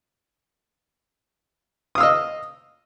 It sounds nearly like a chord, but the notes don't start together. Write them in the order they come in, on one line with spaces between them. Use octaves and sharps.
D#6 F5 E6 D#5